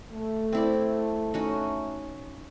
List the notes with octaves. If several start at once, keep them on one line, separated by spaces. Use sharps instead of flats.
A3
C4 E4 D5
C#4 D#4 F#4